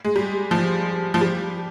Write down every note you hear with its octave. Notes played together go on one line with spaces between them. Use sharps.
G#3
G3
F3
F3
G3